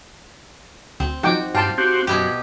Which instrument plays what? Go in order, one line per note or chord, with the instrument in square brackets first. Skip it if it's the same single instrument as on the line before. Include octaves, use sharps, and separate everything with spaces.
[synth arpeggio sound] D2 [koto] C4
[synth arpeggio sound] F3 F#3 [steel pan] D#4 G5 D6 [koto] F#4
[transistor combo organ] G2 [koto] F4 [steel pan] G5 A5 C6
[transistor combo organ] C4 F#4 G4
[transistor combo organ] F#2 [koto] B2 E4 G4